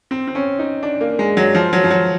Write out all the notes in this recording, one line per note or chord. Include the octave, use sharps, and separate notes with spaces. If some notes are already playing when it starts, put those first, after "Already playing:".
C4
C4
C#4
D#4
D4
A#3
G#3
F#3
F3
F#3
F3
F#3